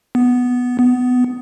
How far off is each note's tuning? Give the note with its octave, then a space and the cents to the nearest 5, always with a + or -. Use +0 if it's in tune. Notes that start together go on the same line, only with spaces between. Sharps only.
B3 +0
B3 +15